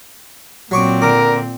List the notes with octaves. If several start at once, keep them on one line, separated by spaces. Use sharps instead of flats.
A#2 F#3 C4 C#6 D6
D3 A#4 D6